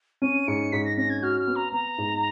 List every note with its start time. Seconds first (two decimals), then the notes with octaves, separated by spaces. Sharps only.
0.22 C#4 D#7
0.47 G#2 C#7
0.72 G#2 B6
0.85 A#6
0.97 C#4 A#6
1.09 G#6
1.22 F#4 F6
1.40 F6
1.47 B3
1.55 A#5
1.72 B3 A#5
1.98 G#2